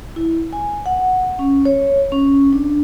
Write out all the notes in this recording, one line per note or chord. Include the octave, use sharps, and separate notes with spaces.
E4
G#5
F#5
C#4
C#5
C#4
D4